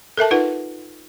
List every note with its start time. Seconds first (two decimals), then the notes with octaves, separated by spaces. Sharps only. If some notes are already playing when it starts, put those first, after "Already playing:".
0.17 A4 A#4 E5 A5
0.31 D#4 F4 B4 F#5